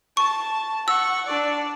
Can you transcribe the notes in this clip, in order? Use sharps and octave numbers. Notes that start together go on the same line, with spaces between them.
A5 C#6
F#5 C#6 E6
D4 D5